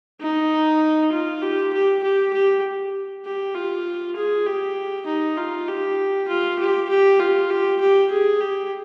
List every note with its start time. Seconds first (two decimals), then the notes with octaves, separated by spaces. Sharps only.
0.21 D#4
1.12 F4
1.43 G4
1.73 G4
2.04 G4
2.34 G4
3.25 G4
3.55 F4
4.16 G#4
4.46 G4
5.07 D#4
5.37 F4
5.68 G4
6.28 F4
6.60 G4
6.89 G4
7.20 F4
7.50 G4
7.80 G4
8.11 G#4
8.41 G4